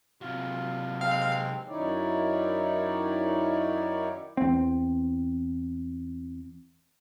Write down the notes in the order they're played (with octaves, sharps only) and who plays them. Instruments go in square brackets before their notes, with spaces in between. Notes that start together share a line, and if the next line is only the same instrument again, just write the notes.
[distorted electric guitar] C3 F#3 [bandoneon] F4
[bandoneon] G#3 C4 [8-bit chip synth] F5 F6
[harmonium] F#2 D#3 D#4 E4 C#5 D5
[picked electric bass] E2 C4